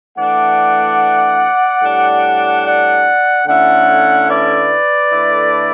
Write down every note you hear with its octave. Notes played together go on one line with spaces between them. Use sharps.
E3 A3 D4 D5 F#5
A2 G3 D4
D5 F#5
D3 A3 C#4 E4 D5 F#5
B4 D5
D3 A3 E4